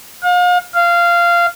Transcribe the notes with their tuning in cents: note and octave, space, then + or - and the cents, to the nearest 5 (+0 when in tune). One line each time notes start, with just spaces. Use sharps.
F5 +40
F5 -15